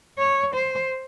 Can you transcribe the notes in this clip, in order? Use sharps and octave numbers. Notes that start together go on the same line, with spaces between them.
C#5
C5